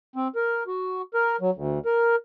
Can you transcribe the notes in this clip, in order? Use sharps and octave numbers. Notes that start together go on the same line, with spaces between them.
C4
A#4
F#4
A#4
F#3
D2
A#4